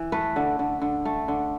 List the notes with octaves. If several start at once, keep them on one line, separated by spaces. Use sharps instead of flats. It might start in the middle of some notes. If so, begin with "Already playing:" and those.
Already playing: E3
A3 B4
D3
D3
D3
A3
D3